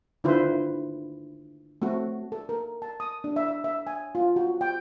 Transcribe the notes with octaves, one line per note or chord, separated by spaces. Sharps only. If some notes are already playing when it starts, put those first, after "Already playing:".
D3 D#3 E4 F4 B4 C5
A3 C4 F#4
A4
A#4
A5
D#6
D4
E5
E5
E5
G#5
F4
F#4
G5